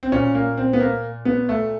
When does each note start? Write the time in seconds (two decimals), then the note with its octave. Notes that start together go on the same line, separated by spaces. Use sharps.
0.03 C4
0.12 A#2 C#4
0.35 A#3
0.57 C4
0.73 B3
0.80 A#3
1.25 B3
1.49 A3